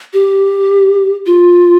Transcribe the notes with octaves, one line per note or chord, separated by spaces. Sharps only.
G4
F4